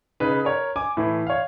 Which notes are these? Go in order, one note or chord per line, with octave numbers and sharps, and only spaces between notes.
C#3 D#4 B4
A#4 C#5
G#5 D6
A2 E3
C#5 F5